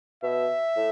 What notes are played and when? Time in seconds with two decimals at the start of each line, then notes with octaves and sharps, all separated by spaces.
0.23 B2 E5
0.76 A2